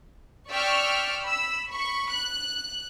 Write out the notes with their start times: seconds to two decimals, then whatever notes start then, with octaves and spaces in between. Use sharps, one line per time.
0.50 D5 G5 C#6 E6 F6 B6
1.25 B5 E6
1.72 B5 C#6
2.13 F#6